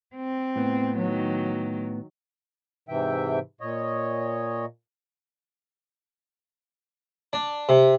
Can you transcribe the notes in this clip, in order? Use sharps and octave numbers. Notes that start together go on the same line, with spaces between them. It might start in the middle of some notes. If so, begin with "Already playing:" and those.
C4
A2 B3
D#3 F#3
G#2 C3 E3 E5 G5
A#2 C#5 D#5
D4
C3